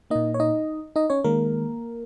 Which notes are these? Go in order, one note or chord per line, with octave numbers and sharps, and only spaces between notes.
A#2 A#3 D#4 D#5
C#5
D#4 D#5
D#4 D#5
C#4 C#5
D#3 G#3 A#3 A#4